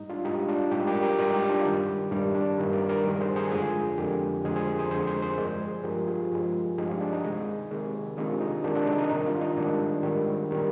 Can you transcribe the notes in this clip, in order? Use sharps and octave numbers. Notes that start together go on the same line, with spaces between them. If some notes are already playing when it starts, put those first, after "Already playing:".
Already playing: G#2 G3 D#4
D4 F4
G#2 G3 D#4 G4
D4 F4
G#2 G3 D#4 G4
G4 A#4
G4 A#4
G#2 G3 G4 A#4
D#4 G4
D4 F4
G2 D#3 G3
G2 D#3 G3 D4
D4
G2 D#3 G3 D#4
A#4 D5
A#4 D5
G2 D#3 G3
G#4 C5
G#4 C5
F2 D3 G#3 F4 G#4
F2 D3 G#3 G4 A#4
F2 D3 G#3 G#4 C5
G#4 C5
G#4 C5
F2 D3 G#3 G#4 C5
G#4 C5
G#4 C5
G2 F3 G#3 A#4 D5
G#4 C5
G2 F3 G#3 G4 A#4
F4 G#4
G2 F3 G#3
G2 F3 G#3 D#4 G4
D4 F4
D4
D#4
C3 D#3 G#3
C3 D#3 G#3
C3 D#3 G#3 D4 F4
D#4
C3 D#3 G#3 D4
D4
D#4
D#4
G#2 D#3 G3 D#4
D4 F4
D#4
G#2 D#3 G3 D4
G#2 D#3 G3
D#3 G3